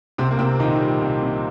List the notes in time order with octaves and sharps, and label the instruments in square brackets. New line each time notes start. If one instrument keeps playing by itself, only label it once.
[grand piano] C2 C3 C4
A#3
C2 C3 C4
A#2 D#3 D#4
G3
C2
C2